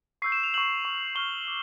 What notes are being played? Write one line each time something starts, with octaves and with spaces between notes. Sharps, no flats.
C#6 E6 G6 C7
E7
F7
C#6 E6 G6 F#7
C#6 F6
C#6 F6 G7
D6